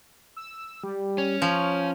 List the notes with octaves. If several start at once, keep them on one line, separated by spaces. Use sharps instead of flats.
E6
G3
C#4
F3 C#5